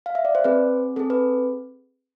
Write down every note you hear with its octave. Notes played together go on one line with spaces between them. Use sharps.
F5
E5
D5
C5
C4 G#4 B4
C4 G#4 A4
B4